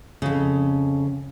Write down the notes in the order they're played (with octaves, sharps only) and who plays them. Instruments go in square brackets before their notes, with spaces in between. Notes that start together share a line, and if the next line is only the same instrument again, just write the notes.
[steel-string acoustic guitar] F2 C#3